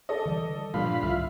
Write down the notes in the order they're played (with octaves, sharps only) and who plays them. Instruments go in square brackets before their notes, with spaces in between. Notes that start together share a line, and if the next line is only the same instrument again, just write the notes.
[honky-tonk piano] A4 D5 D#5
[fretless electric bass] D3 E3 G3
[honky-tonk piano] G2 D3 [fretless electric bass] A#2 F3 G3 [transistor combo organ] F4 F5 B5
[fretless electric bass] C2 A2 D#3 [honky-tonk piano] E5 F6